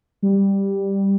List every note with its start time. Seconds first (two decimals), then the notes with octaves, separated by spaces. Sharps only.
0.23 G3